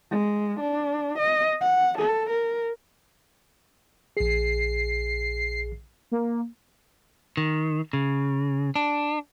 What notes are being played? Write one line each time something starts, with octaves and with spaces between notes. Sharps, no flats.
G#3
D4
D#5
F#5
A4
A#4
A#1 G#4 C7
A#3
D#3
C#3
D4